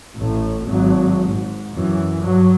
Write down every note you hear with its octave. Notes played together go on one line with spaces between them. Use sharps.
A1 A2
G#1 F#3
G#2
F#2 E3
G2 F#3